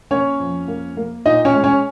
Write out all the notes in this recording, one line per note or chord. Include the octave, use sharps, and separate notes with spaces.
A#3 C#4 C#5
F2
A#3
A#3
A#2 D#4 D#5
C#4 C#5
G#3
C#4 C#5